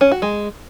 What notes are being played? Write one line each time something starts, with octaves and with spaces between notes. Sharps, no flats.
C#4
F#4
G#3